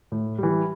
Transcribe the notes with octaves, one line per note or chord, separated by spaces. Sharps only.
A2
E3 G3